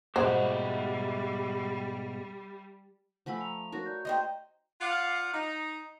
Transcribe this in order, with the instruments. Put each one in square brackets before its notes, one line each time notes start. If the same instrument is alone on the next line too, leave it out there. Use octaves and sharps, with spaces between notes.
[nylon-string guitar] G#2 B2 [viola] G3 [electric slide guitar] G4 E5 F#5 [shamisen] C5
[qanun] F3 A3 B5 [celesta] F#5 G#5 E6
[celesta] A#5 F7
[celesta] D#4 A#4 A#6 [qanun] F#4 C#5
[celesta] D5 A#5 G6
[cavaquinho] D#4 C5 G5 [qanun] D#5
[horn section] F4 D5 F5 F#5
D#4